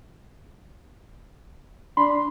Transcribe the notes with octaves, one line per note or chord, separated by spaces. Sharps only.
D4 B5 C6